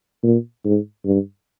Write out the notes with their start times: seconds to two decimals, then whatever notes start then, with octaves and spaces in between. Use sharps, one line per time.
0.23 A#2
0.65 G#2
1.05 G2